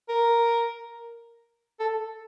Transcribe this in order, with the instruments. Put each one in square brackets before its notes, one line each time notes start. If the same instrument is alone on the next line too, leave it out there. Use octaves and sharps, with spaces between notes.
[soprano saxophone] A#4
A4